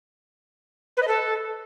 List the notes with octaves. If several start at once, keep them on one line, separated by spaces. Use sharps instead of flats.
B4
D#5
A4